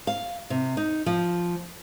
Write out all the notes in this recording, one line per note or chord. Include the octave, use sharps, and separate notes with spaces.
F5
C3
D#4
F3